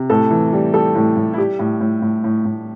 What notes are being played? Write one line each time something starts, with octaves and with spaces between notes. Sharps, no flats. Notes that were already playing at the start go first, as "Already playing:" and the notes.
Already playing: C3
A2 A4
E3
G3
G3 A4
A2
A2
E4
G3 G4
A2
A2
A2
A2
A2